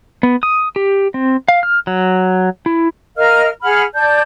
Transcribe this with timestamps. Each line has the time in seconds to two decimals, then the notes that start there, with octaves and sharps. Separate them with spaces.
0.23 B3
0.43 D#6
0.76 G4
1.14 C4
1.48 F5
1.63 F6
1.87 F#3
2.66 E4
3.17 A#4 D#5 F5 F6
3.62 G#4 F#5 B5 F6
3.94 D5 A5 G6